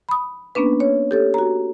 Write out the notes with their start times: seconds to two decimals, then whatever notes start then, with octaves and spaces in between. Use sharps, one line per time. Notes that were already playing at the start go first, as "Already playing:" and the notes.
0.09 B5 D#6
0.55 A#3 B3 C#4 D4 B4
0.80 C#5
1.11 G4 A4 C#5
1.34 F#4 A#5